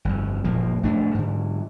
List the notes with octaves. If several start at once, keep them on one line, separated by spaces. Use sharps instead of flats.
G1 F2
F#1 A#2 F3 A#3
F1 A2 A3 D4
G#2 D3